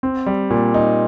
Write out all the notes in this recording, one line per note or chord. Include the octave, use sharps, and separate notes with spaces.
C4
G3
A#2
D#4